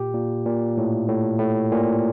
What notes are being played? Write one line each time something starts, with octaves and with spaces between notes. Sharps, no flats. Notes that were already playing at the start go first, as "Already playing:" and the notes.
Already playing: A#2 G4
A#2
A#2
A2
A2
A2
A#2